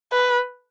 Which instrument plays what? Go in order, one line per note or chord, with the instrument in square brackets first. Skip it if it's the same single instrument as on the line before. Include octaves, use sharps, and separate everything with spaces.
[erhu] B4